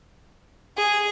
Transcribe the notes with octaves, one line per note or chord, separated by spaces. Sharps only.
G#4